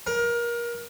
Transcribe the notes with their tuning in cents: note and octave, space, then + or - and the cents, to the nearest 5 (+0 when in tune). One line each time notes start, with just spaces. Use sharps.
A#4 +25